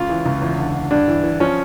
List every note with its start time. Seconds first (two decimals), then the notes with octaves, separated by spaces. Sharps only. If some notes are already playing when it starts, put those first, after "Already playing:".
Already playing: C#2 C#3 F4
0.09 E3
0.26 C#2
0.42 E2
0.58 D3
0.75 D3
0.91 G2 D4
1.08 E3
1.24 E3
1.40 F3 C#4